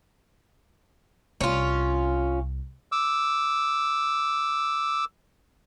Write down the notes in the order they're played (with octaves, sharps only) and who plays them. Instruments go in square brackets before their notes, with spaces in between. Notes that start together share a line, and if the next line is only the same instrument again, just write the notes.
[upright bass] C2 [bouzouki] C#4 F4
[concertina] D6 E6